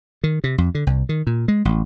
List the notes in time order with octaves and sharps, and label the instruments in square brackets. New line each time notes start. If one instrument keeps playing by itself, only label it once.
[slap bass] D#3
C3
F2
D3
C2
D#3
A#2
G#3
A1